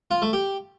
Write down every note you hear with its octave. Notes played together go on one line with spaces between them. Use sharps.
F4
A3
G4